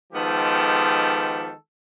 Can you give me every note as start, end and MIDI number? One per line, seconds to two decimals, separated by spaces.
0.13 1.52 51
0.13 1.52 53
0.13 1.52 56
0.13 1.52 59
0.13 1.52 67
0.13 1.52 69